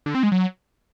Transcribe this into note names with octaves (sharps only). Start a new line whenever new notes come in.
D3
C4
G#3
F#3